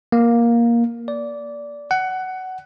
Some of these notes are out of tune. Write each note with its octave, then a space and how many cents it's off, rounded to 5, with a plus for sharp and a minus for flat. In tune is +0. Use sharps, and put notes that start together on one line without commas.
A#3 +10
D5 -15
F#5 +15